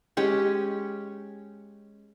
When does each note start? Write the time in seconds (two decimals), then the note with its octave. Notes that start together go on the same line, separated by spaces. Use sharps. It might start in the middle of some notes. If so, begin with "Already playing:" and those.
0.17 G#3 C#4 G4